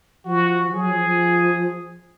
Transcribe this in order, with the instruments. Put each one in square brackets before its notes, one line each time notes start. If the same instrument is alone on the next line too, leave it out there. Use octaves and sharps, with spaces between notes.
[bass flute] F3 [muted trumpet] F#4
[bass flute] F3
[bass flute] F#3 [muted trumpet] G#4
[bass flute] F3
F3